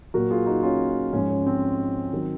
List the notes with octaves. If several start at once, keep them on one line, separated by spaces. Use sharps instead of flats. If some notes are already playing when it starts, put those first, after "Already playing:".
A#2 F#3 F#4 A#4
F4 G#4
D#4 F#4
C#4 F4
G#2 F3 G#3 C#4
C#4
C4
D#3 F#3